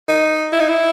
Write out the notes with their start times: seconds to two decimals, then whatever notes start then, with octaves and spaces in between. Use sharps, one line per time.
0.09 D#4
0.53 E4
0.60 D#4
0.69 E4